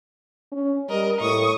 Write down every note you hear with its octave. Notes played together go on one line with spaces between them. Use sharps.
C#4
G3 A#4 D#5
A2 C#6 D#6